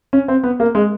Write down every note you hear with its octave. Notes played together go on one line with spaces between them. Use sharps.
C#4
C4
B3
A#3
G#3